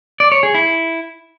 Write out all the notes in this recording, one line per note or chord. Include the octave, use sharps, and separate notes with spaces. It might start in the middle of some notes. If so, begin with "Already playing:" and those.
D5
C#5
G#4
E4